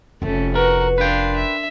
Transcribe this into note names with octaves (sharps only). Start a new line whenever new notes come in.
F1 A3 C#4 E4
F#4 A#4 B4
D4 A#4 B4 F5 G5 C6
E5